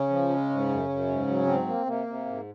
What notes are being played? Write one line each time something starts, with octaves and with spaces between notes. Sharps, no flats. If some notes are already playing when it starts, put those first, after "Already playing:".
Already playing: C#3 C#4
F3
G#3
G#2
F#2
F#2
G#2
F#3
G#2 C4
A#3
C3 A#3
C3
G#2